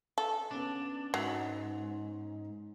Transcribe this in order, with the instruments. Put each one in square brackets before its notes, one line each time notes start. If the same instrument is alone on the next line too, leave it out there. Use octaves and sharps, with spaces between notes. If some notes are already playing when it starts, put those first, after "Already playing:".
[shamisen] A4
[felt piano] B3 C#4 [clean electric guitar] D4
[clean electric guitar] G#2 [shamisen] F#3